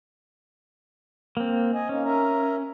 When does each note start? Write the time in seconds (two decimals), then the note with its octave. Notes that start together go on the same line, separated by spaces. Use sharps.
1.37 A#3 C4
1.73 D#5 G#5
1.89 A#3 C#4 D#4
2.04 A#4 E5 A#5